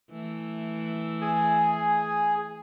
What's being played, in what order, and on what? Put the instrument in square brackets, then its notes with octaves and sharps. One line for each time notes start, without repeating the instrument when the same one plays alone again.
[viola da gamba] E3 A3
[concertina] G#4 G#5